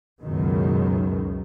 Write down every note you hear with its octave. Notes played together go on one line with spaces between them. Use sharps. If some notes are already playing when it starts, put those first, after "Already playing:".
C#2 F#2 B2 D#3